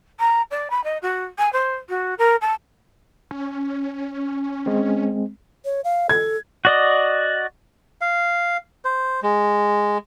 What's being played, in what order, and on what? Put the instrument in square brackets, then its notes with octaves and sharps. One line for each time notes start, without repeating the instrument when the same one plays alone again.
[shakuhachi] A#5
D5
B5
D#5
F#4
G#5
C5
F#4
A#4
A5
[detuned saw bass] C#4
[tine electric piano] G#3 C4
[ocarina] C#5
F5
[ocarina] A4 [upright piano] G#6
[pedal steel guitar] F#4 D5 D#5
[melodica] F5
C5
G#3